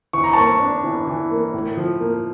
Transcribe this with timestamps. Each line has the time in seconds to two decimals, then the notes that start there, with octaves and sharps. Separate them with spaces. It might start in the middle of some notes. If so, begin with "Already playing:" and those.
0.13 E3 C#6
0.24 A#5
0.33 A#3 A5 C#6
0.60 D4
0.84 E3
1.07 E3
1.31 A#3
1.54 A2
1.77 F3
2.01 A#3